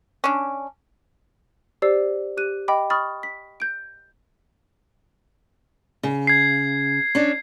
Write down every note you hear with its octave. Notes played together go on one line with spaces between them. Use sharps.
C#4 D4
G4 C5 D5 E6 C7
G4 F#6 D#7
D#5 G5 B5 D6
B5 C#6 D#6 F6 A6
B6
G6 D7
C#3
G#6 C7
C#4 D4